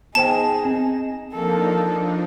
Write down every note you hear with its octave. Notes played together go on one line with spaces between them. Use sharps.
B3 D#4 G#4 C5 G5 A5
C4
F3 A#3 D4 D#4 A4